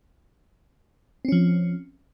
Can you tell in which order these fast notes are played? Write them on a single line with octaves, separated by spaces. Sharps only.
C4 C#4 F3